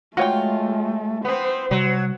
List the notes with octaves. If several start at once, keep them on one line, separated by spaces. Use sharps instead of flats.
G#3 A3 F4 F#4 C#5 G5
B3 C4 C5
C3 F#3 G3